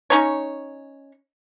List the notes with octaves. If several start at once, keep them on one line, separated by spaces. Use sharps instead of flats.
C#4 D#4 C#5